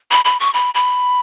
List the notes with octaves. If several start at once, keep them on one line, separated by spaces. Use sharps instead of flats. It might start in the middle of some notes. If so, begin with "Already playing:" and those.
B5
B5
C#6
B5
B5